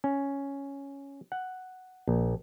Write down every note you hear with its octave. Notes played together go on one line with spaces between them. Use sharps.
C#4
F#5
A#1